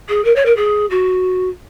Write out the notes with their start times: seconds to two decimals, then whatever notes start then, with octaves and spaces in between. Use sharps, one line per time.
0.08 G#4
0.24 A#4
0.35 C#5
0.45 A#4
0.56 G#4
0.90 F#4